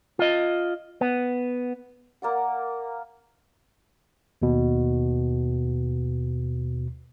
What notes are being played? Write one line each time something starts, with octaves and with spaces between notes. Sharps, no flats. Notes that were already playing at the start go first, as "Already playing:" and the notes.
F4 D#5
B3
A#3 D5 F#5
D#2 B2